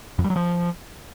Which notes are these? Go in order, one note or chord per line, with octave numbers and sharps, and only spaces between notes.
F2
G3
F#3
F3